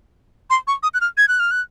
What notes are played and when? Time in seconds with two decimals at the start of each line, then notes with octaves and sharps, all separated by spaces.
0.50 C6
0.67 C#6
0.83 D#6
0.94 F#6
1.01 F6
1.17 G#6
1.28 F#6
1.40 F6
1.51 F#6